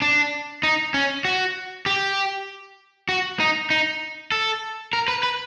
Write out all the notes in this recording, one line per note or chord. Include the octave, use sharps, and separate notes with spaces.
D4
D#4
C#4
F#4
G4
F#4
D#4
D#4
A4
A#4
B4
B4